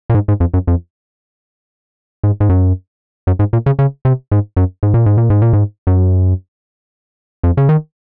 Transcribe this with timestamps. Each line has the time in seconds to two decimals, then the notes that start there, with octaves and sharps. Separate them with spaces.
0.10 A#2
0.14 G#2
0.28 G#2
0.40 F2
0.54 F#2
0.67 F2
2.24 G#2
2.40 G#2
2.49 F#2
3.27 F#2
3.39 G#2
3.53 A#2
3.66 C#3
3.79 C#3
4.05 C3
4.32 G#2
4.57 F#2
4.83 G#2
4.94 A#2
5.06 G#2
5.18 A#2
5.30 G#2
5.42 A#2
5.53 G#2
5.87 F#2
7.44 F2
7.57 C#3
7.69 D#3